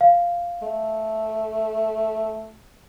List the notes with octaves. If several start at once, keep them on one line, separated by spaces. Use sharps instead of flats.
F5
A3